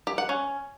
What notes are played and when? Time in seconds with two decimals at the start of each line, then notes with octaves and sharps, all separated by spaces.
0.07 G4
0.18 F#5
0.29 C#4